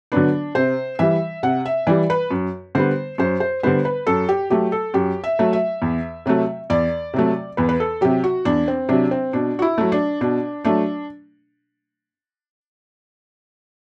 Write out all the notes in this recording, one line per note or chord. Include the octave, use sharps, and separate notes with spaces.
D3 F#3 B3 D4
C3 C5
E3 G3 E5
C3 F#5
E5
E3 G3 D5
B4
F#2
D3 G3 B3 C5
F#2 C5
C5
D3 G3 B3 C5
B4
F#2 A4
G4
F#3 A3 G4
A4
F#2 G4
E5
F#3 A3
E5
E2
C3 F#3 A3
E2 D5
C3 F#3 A3
E2 B4
B4
A4
C3 F#3 G4
F#4
E2 D4
C4
C3 F#3 D4
C4
B2 D4
F#4
E4
F#3 A3
D4
B2 D4
F#3 A3 D4